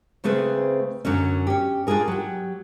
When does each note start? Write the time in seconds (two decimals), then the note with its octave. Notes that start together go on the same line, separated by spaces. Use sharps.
0.24 C#3 A3 C4 G#4 B4 C5
1.05 F#2 D3 F#3 C#4
1.47 C#4 G4
1.87 D4 F4 G4 G#4 A#4
2.08 F#3 G4